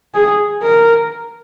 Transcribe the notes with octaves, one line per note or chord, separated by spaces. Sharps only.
G#4
A#4